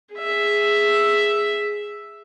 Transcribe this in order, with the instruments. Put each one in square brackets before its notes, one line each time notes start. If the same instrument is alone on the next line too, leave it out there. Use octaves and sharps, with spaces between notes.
[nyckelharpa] G#4 E5